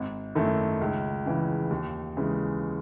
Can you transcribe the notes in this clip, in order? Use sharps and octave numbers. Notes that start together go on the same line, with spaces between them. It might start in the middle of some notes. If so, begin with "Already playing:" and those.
Already playing: G#1
F#2 D#3 A3 E4
C#2
C#3 E3
D#2
C#3 E3 G#3